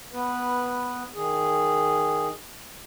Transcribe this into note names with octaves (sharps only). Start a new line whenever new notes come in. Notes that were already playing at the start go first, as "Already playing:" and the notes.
B3 B4
D#3 G#4